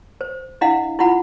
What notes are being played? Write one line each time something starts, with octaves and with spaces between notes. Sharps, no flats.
C5
D4 E4 D#5 F5 F#5
E4 F4 F#5 B5